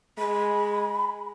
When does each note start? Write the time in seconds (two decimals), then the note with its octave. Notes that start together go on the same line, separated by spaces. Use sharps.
0.19 G#3 B5